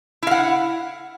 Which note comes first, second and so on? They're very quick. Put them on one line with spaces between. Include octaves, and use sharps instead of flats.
E4 F5 F#5